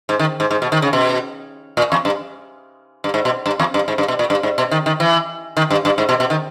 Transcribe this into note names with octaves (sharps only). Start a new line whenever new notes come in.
G#2
D#3
G#2
G#2
B2
D#3
C#3
B2
A#2
E2
G2
G2
G#2
B2
G2
E2
G2
G#2
G2
B2
A#2
G2
G#2
B2
D#3
D#3
E3
D#3
G2
G2
G#2
B2
B2
D#3